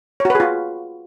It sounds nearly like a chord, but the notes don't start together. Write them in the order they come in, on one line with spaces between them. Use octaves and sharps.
C#5 F#4 B4 G#4 F4